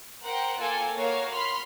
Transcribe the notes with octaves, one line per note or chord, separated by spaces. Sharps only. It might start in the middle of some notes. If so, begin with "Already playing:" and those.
A#4 C5 F#5 G5
A#3 F4 A4 G#5
A#3 F#4 A#4 C#5 F5
B5 C6 F6